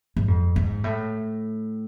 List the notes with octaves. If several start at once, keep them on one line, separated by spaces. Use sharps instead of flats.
G#2
F2
G#2
A2